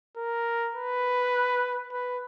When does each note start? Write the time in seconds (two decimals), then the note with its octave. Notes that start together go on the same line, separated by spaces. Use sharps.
0.17 A#4
0.75 B4
1.92 B4